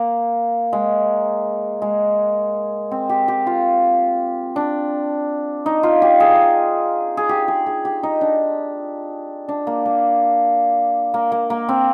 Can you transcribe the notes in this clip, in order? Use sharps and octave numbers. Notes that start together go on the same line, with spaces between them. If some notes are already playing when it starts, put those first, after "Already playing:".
Already playing: A#3
G#3
G#3
C4
G4
G4
F4
D4
D#4
F4
G4
G#4
G#4
G4
G#4
G#4
G4
D#4
D4
D4
A#3
A#3
A#3
A#3
A#3
C4